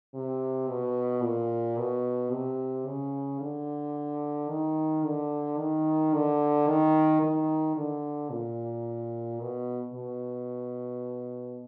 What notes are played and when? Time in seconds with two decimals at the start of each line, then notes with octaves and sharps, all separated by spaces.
0.14 C3
0.68 B2
1.23 A#2
1.78 B2
2.32 C3
2.86 C#3
3.40 D3
4.49 D#3
5.04 D3
5.58 D#3
6.13 D3
6.68 D#3
7.22 D#3
7.77 D3
8.30 A#2
9.40 B2
9.94 B2